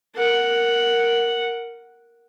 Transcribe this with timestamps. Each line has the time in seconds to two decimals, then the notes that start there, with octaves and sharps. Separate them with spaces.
0.16 A#4 F#5